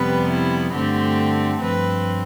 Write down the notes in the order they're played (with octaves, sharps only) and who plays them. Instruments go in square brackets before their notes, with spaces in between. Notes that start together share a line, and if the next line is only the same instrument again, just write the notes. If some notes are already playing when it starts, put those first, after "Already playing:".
Already playing: [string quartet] F2 C3 G3 B3 B4
E4
G2 D3 A3 C4 G4
G2 F3 C4 B4